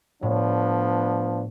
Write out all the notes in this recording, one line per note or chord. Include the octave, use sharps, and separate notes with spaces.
A2 F3 B3 D4